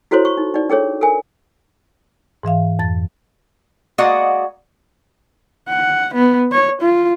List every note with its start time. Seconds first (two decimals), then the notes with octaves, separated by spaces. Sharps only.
0.11 E4 F#4 A4 C5 C#5 C6
0.25 C#6
0.37 D#4
0.54 D#4 D5
0.70 D4 G#4 A4 C#5
1.01 A4 A#4 G#5
2.43 G#2 E3 E5 F5
2.79 F2 A6
3.98 G#3 A#3 F#4 D5 D#5 F#5
5.68 F#5
6.14 B3
6.52 C#5
6.81 F4